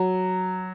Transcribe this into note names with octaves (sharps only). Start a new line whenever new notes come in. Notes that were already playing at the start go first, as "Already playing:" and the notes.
Already playing: F#3